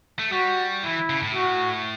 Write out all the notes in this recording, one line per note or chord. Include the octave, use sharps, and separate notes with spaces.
A3
G3 F#4
E3 E4
C#3
A2
F#4